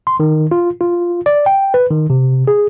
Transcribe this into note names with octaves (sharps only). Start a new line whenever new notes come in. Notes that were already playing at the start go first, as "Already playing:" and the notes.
C6
D#3
F4
F4
D5
G5
B4
D#3
C3
G#4